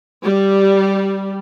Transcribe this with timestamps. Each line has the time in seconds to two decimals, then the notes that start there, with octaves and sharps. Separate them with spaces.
0.24 G3